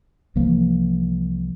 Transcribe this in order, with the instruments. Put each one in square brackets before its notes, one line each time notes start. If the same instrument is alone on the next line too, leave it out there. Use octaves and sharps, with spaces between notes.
[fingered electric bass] C2 E3 F3 A#3